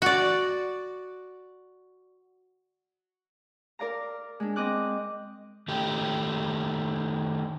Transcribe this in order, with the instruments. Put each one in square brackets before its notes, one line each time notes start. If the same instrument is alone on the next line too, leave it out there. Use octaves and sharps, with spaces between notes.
[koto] F#4 D5
[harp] A#4 D5 F5 A#5
G#3 D4
C4 D#5 D6 F#6
[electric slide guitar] D#3 A3 G4